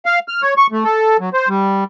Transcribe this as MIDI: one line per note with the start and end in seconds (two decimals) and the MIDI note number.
0.06 0.19 77
0.28 0.42 89
0.42 0.54 73
0.57 0.67 85
0.72 0.84 57
0.84 1.17 69
1.20 1.29 54
1.33 1.48 72
1.49 1.84 55